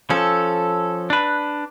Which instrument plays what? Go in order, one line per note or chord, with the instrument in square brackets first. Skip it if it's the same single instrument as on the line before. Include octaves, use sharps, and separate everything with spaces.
[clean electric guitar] F3 C#4 [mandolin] A4
[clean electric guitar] D4 B4